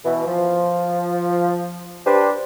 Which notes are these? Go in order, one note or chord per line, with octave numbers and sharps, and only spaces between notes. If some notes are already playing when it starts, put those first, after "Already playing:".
B2 E3
F3
D4 G4 B4 C5